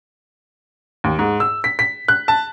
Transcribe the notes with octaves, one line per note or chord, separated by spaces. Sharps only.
D#2
G#2
E6
B6
B6
F#6
A5